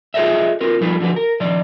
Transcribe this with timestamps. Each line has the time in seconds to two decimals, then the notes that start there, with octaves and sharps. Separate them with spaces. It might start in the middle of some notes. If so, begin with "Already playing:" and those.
0.14 F4 G#4 A4 C#5 D#5 E5
0.61 C4 F4 A#4 B4
0.81 F3 G3 D#4 F4 A4 B4
1.00 D3 F3 F#4 B4
1.16 A#4
1.40 D#3 F3 D5 D#5